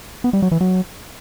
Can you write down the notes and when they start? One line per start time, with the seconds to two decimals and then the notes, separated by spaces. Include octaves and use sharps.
0.24 B3
0.33 G3
0.42 F#3
0.51 E3
0.61 F#3